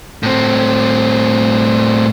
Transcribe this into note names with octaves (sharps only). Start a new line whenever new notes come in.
A2 C4